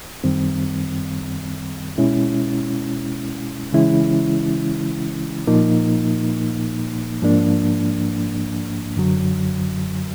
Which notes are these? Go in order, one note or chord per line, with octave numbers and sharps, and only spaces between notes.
F#2 D#3 G3 C4
B2 G#3 C#4 E4
C#3 E3 G#3 C#4 E4
A#2 F3 A#3 D#4
G#2 F3 A#3 D4
F#2 D3 F#3